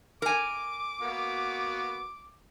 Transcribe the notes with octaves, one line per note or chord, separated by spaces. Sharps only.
A#4 G#5 D6
A#3 B3 F#4